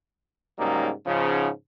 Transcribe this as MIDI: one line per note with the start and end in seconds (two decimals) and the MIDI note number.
0.58 0.90 44
0.58 0.90 49
0.58 0.90 54
0.58 0.90 55
0.58 0.90 58
0.58 0.90 63
1.06 1.48 44
1.06 1.48 49
1.06 1.48 53